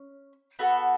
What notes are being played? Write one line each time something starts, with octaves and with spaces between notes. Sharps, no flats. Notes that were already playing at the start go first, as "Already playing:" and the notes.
Already playing: C#4
B3 F#4 A4